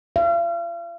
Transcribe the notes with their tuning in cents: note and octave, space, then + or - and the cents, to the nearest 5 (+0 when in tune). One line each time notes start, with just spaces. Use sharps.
F5 -40